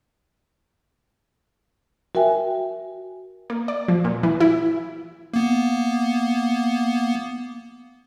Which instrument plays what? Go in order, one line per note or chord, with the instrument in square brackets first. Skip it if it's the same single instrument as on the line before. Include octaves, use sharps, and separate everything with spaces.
[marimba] F#4 A#4 E5 G5 G#5
[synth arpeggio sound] A#3
D5
F3
A#2
E3
E4
[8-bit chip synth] A#3 B3